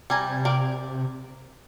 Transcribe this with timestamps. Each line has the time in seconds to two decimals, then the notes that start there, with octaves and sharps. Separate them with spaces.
0.10 C3 G3 G#5 A#5
0.45 A#4 D5 G5